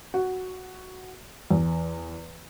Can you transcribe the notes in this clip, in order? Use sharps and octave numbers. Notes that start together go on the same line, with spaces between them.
F#4
E2